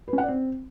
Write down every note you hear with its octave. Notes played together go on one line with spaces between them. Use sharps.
B4
C#4
F#5
D5
C4